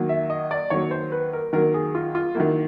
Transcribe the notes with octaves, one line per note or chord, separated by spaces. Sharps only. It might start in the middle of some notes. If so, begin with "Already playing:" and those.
Already playing: D#3 F#3 A#3
E5
D#5
D5
D#3 F#3 A#3 C#5
C5
B4
A#4
D#3 F#3 A#3 A#4
G#4
F4
F4
D#3 F#3 A#3 E4